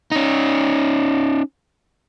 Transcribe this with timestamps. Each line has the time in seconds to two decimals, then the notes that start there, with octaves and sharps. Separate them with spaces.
0.12 C#4 D#4